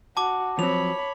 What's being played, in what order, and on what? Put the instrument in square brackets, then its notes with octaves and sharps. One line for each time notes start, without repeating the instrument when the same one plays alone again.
[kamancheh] F#4 [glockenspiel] A5 D6
[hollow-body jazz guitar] F3 F#3 C4 [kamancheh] C#5 B5 [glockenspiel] F7